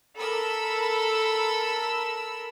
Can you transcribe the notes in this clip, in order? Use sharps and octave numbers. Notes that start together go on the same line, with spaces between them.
A4 A#4 B5 E6